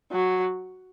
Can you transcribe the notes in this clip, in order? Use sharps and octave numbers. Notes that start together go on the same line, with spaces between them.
F#3